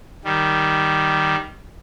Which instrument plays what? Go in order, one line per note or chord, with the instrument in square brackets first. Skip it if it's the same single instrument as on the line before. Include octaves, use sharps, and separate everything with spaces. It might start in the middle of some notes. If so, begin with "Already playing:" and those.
[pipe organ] D#3 G3